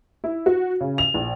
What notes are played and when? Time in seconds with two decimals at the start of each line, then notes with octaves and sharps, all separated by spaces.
0.24 E4
0.46 F#4
0.81 C#3
0.98 F7
1.14 A#1